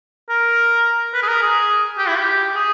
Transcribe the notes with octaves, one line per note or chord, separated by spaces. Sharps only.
A#4
B4
G#4
A#4
G#4
G4
E4
G4
G#4